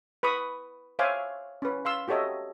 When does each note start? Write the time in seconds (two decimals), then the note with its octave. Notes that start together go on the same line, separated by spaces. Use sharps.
0.23 B4 B5 C#6 D#6
0.99 C5 C#5 E5 F5 G#5 D6
1.62 C#4 B4
1.85 F5 C6 E6
2.08 F#4 G4 A4 C#5 D#5 E5